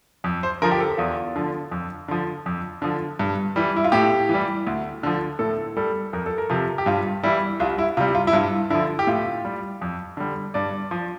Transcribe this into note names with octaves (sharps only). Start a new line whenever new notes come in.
F2
C5
D3 F3 A#4
G4
A4
E2 F4
D3 F3
F2
D3 F3
F2
D3 F3
G2
E3 G3
E4
F4
A2 G4
E3
G3
D2
D3 F3
A2 A4
G3 A4
F2 A#4
A4
A#4
C3 F3
G4
G2 F4
E3 G3 E4
C2 F4
E4
C3 G3 F4
F4
E4
G2 F4
D3 F3 E4
G4
A2 F4
G3
F2
D3 G3
G2 D5
F3